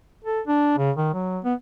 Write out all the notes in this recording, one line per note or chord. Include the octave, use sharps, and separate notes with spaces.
A4
D4
C#3
D#3
F#3
B3